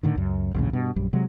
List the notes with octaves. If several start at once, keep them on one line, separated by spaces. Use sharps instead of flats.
A2 D3 D#3
C#2 F#2
A#1 D#2 A2 C#3
G2 B2
A#1 F#2 G3
C3 F#3 G#3